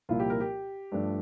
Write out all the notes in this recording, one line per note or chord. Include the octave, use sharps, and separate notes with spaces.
C2 A#2 F3 A#3 E4 F4
G4
A#4
G4
G2 F3 A3 D4